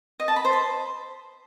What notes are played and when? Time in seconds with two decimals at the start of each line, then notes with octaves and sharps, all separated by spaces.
0.20 D#5
0.28 A5
0.36 B5
0.45 C5
0.53 C6